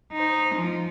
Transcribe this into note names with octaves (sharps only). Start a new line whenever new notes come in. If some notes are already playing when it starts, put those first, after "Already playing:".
D#4 C5
F3